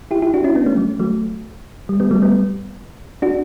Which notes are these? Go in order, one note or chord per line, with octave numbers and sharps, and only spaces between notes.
E4 G4
E4 G4
D4 F#4
C#4 E4
B3 D4
A3 C#4
F#3
F#3 A3
G3
G3 B3
F#3 A3
G3 B3
D4 F#4